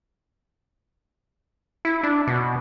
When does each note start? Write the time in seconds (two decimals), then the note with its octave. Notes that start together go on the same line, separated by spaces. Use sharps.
1.85 E4
2.03 D4
2.28 B2